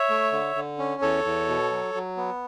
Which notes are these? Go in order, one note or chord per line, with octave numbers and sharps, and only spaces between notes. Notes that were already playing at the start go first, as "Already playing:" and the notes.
Already playing: C#5 E5
A3
D3
D3
C#4
E2 A4 C#5
E2
B2
F#3
F#3
B3